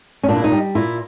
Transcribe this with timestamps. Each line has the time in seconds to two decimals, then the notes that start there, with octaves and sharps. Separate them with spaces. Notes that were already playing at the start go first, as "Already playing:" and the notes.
0.23 C#4
0.29 A#2 D4
0.37 E4
0.44 D#4
0.52 G3
0.75 A#2 E4